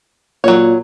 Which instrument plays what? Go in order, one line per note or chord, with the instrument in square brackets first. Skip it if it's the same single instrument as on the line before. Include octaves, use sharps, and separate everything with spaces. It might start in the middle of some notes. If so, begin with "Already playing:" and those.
[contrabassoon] A#2 [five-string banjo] F#3 C#5